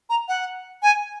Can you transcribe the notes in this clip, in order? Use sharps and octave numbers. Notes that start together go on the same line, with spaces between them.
A#5
F#5
G#5